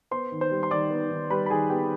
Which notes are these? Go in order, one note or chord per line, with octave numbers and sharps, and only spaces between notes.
B3 C5 C6
D#3
C5 C6
G3
C6
D#3 D5 D6
B3
D#3
G3 B4 B5
B5
D#3 G#4 G#5
B3 G4 G5